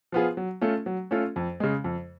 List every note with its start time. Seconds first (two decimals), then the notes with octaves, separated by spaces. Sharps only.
0.12 F3 B3 F4 G#4
0.37 F#3
0.61 A3 C#4 F4 A4
0.86 F#3
1.11 A3 C#4 F4 A4
1.36 F2
1.60 C#3 G#3
1.84 F2